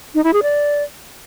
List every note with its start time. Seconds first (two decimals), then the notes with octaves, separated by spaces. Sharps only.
0.15 D#4
0.24 E4
0.33 G#4
0.43 D5